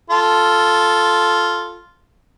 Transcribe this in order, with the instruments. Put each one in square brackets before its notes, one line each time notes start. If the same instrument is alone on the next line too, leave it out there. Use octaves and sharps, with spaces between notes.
[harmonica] F4 A4